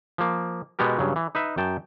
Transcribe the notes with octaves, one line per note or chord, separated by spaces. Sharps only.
F3 A#3
B2 G#3 B3 G4 A#4
G2 C#3 F#3
E3
D#4 B4 E5
F#2 G5 A5